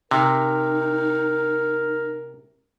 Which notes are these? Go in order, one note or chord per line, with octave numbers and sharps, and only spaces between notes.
C3 D#4 A#4